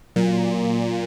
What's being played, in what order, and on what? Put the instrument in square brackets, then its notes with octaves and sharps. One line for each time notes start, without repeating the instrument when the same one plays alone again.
[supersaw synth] A#2 [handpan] F#3